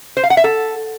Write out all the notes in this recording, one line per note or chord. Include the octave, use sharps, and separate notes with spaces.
C5
F5
F#5
E5
A4